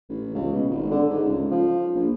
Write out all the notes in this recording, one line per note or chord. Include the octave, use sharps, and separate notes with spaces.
A1
C#2
B2
G#1
D3
G#2
C#2
F3
A#1